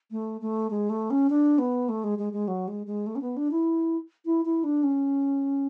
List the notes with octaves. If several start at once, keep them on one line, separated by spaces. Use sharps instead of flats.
A3
A3
G#3
A3
C#4
D4
B3
A3
G#3
G#3
G#3
F#3
G#3
G#3
A3
C#4
B3
D4
E4
E4
E4
D4
C#4